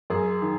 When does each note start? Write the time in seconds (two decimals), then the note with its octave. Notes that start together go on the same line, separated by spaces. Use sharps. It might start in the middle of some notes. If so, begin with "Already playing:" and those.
0.10 F#2 G#4
0.42 D#3